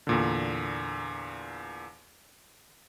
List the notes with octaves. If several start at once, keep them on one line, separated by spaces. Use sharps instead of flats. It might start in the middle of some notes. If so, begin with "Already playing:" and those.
E2 A#2 D3